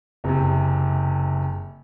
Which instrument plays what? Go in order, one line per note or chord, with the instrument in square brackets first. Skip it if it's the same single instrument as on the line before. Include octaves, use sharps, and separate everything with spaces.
[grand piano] F#1 C3